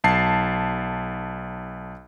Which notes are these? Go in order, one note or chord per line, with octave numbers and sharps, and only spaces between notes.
B1 A5 C7